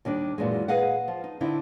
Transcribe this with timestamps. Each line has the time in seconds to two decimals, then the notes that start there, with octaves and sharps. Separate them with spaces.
0.05 D#2 D#3 G3 D4
0.38 F#2 A#2 E3 G#3
0.68 G#4 B4 D#5 F5 F#5
1.08 F3
1.24 D#4
1.41 D3 C4 D#4 E4